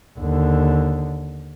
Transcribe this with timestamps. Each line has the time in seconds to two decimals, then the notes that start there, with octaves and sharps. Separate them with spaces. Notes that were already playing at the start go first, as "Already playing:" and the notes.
0.19 D#2 D3